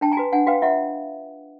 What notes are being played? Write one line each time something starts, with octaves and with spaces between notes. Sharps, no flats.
D4 G5 A5
G#5 A#5
F#4 B4
D4 F#5 G#5
F#4 B4 F5 G5
F4 E5 F#5